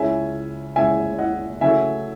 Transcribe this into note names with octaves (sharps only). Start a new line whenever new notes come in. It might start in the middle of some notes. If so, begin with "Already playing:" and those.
Already playing: C#2 C#3 G#3 C#4 E4 E5 G#5
C#2 C#3 G#3 C#4 E4 E5 G#5
D#5 F#5
C#3 F#3 A3 E5 G#5